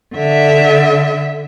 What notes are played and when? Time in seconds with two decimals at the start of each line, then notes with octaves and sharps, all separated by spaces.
0.14 D3 E5